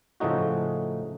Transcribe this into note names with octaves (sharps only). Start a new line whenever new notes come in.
A2 C#3 F3 A3 D#4 F#4